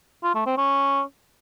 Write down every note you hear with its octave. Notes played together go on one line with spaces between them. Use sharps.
F4
A3
C4
C#4